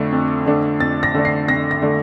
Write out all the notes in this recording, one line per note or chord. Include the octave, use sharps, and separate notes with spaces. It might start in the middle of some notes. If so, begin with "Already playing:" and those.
Already playing: F2 D3 A3 D4
F2
D3 A3 D4
F2 A6
A#6
D3 A3 D4
C7
F2 A#6
A#6
D3 A3 D4